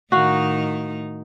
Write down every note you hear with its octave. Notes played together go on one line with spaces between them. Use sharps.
A2 D#3 D#4 F#4 F5